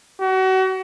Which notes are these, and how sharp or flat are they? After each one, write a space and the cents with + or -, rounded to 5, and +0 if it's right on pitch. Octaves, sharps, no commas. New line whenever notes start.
F#4 +35